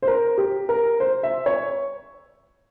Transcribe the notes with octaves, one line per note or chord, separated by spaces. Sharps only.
C5
A#4
G4
A#4
C5
E5
C#5